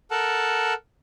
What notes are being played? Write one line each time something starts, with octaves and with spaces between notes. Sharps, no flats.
A4 A#4 F#5 A5